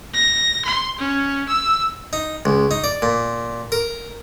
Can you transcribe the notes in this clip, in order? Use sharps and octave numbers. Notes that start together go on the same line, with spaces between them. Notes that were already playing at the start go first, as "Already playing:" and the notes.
A#6
C6
C#4
E6
D#4
C#2
D#4
D5
A#2
A#4